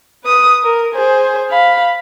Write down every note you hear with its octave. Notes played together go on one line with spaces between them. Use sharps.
B4 D#6
A#4
G#4 C5
F5 B5